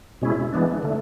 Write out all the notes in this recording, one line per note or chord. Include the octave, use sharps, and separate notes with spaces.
B2 G#3 C#4 E4
E3 G#3 B3 D4
D3 A3